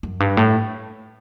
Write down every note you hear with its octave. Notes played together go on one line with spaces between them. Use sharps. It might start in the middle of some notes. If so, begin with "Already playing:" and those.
F#2
G2
A2